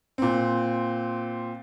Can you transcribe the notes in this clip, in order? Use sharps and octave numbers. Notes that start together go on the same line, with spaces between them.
A#2 C4